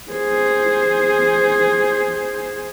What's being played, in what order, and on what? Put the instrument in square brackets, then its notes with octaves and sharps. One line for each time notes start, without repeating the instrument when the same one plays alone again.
[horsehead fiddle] G#4 C5